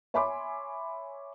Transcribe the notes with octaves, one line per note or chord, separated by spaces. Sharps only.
C#5 E5 G#5 B5 C6 D6